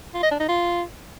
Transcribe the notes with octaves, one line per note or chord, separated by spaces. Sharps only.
F4
D#5
D4
D#4
F4